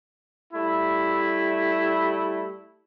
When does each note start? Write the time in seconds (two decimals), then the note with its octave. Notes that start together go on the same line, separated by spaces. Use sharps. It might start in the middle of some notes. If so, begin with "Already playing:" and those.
0.53 G3 A3 E4